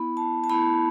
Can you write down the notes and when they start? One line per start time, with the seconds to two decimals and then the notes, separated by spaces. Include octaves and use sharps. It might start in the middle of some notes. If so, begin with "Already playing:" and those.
Already playing: B3 E4 B5
0.17 A5
0.44 A5
0.50 B3 E4 B5